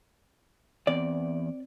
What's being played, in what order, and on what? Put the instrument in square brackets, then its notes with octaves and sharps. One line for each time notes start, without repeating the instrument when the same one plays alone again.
[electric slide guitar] E2 [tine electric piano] C4 [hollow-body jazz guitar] D5